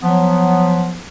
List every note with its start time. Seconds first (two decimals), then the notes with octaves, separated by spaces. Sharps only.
0.03 F3 F#3 B3